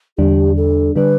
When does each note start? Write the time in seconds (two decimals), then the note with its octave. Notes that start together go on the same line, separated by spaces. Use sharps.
0.17 E2 D3 G3 D4 G4
0.57 A4
0.95 D3 G3 D4 B4